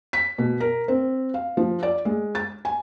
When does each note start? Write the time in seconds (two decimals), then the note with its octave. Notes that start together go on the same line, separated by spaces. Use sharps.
0.13 B6
0.38 B2
0.60 A#4
0.88 C4
1.34 F5
1.57 F3
1.83 D5
2.05 G#3
2.35 A6
2.65 G#5